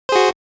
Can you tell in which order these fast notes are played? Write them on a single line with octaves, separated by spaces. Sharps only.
C5 G#4 F#4